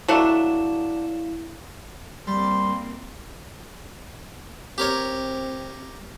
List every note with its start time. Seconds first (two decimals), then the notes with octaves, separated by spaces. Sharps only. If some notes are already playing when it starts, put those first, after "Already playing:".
0.08 F#3 A3 D4 E4 F5 E7
2.27 G3 A#3 C4 C6
4.78 C4 G4 A#4 C#5